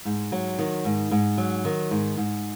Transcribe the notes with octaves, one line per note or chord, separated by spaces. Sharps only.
G#2
F#3
D#3
G#2
G#2
F#3
D#3
G#2
G#2